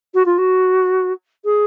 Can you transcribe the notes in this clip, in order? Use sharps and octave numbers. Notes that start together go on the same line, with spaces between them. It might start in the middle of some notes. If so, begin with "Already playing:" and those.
F#4
F4
F#4
G#4